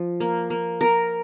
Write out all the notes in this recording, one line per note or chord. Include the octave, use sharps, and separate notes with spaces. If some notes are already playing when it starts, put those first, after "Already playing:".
Already playing: F3
A#3
A#3
A#4